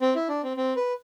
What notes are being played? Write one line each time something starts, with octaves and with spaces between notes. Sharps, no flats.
C4
E4
D4
C4
C4
B4